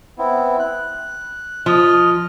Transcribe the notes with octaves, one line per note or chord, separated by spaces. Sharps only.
B3 C4 E4
F#6
F3 D#5 F6